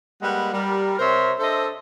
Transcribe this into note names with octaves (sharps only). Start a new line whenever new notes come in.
G3 G#3 A#3 B4 F#5
G3 A#4
C3 A#4 C5 C#5 E5 C6
D4 A4 C5 D#5 E5